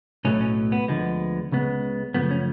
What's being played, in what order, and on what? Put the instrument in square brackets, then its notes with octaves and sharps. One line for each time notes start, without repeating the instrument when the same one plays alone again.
[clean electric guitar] B1 A2 F#3 A3 C#4
C#4
B3
D2 D3 F3 G#3 B3
C#2 C#3 G#3 B3
F#2 C#3 F3 A3 B3
C#4